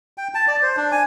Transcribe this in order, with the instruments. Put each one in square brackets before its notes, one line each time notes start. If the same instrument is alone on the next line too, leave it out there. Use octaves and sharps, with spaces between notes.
[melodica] G5
A5
D5
C5
D4
G#5